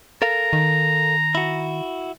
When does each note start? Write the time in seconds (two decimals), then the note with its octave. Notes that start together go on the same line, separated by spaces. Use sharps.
0.22 A4 A#4 F5 A#5
0.53 D#3
1.35 E4 F#4